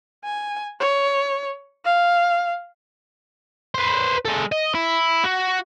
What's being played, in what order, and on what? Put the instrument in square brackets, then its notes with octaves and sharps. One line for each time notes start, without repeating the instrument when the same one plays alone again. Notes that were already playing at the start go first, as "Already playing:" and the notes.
[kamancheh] G#5
C#5
F5
[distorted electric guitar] B4 C5
G#3 A4
D#5
E4
F#4